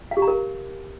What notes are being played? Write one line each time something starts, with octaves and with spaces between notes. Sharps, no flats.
F5
G4
A#5
A#4